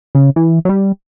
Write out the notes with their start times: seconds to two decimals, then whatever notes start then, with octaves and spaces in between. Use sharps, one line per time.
0.15 C#3
0.36 E3
0.65 F#3
0.69 G3